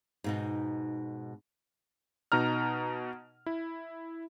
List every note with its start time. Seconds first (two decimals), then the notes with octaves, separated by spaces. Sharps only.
0.24 G#2 B2 D#4
2.32 B2 D#4 A#5 F6
3.46 E4